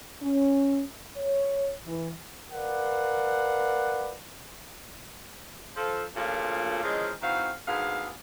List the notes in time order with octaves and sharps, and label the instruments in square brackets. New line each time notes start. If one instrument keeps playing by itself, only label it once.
[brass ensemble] C#4
C#5
E3
A#4 B4 D5 F5 F#5
[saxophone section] F3 A4
D2 A#2 C#3 F3 A#3 A4
E3 F3 G#3 C#4 A#4 D#5
D#3 E3 C4 F#4 F5
D2 G#2 B3 G#4 F5